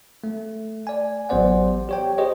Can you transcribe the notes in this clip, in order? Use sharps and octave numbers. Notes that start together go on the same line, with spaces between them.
A3
D5 G#5
A1 F#3 B3 C5 D5 F#5
G4 C#5 G5
G4 G#4 C5 C#5 D#5